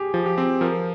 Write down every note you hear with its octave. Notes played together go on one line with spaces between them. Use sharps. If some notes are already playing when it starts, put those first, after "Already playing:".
Already playing: G4 G#4
F3
G4
C4
F3 A#4